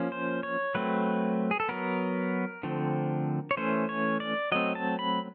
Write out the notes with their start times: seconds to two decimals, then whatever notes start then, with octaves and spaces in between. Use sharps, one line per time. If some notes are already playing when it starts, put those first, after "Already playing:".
Already playing: F3 A#3 C#4
0.12 C5
0.43 C#5
0.75 F#3 A3 C4 B4
1.51 G#4
1.60 A4
1.69 F#3 B3 A#4
2.63 D3 F3 A3 C4
3.51 C#5
3.57 E3 A3 C#4 C5
3.89 C#5
4.20 D5
4.52 F#3 A3 C4 D#5
4.75 A5
4.99 B5